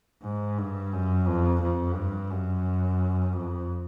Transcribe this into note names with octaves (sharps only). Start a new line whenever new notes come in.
G#2
G2
F#2
F2
F2
G2
F#2
F2